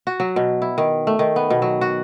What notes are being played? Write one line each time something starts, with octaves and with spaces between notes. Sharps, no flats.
F#4
F#3
B2
E4
D#3
A3
D#3
B3
B2
F#3
F#4